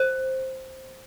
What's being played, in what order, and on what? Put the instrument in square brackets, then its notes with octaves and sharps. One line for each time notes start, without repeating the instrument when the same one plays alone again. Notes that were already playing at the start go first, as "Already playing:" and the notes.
Already playing: [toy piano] C5